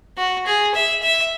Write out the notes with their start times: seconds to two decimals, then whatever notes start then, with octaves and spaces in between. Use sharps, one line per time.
0.18 F#4
0.46 G#4
0.74 E5
1.02 E5